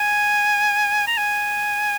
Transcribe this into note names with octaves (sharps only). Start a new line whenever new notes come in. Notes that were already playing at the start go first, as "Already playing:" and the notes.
Already playing: G#5
A#5
G#5